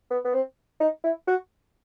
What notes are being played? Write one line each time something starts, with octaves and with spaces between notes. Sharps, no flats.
B3
B3
C4
D#4
E4
F#4